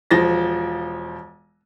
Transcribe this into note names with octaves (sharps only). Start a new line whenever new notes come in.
E1 F3 A6 A#6